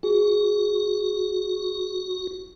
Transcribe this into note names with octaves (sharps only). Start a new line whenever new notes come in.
F#4 G#4